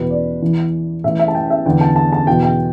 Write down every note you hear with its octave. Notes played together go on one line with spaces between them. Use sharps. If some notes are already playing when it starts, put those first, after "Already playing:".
Already playing: E2 B2 B4
D5
E2 E3
A2 E3 E5
E5
A5
G5
E5
E2 D3 G5
A5
A5
A5
E2 B2 G5
G5